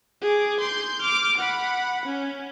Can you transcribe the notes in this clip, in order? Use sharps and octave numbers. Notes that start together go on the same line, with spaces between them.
G#4 D6
C6 G6
D6 F6
F#5 B5
C#4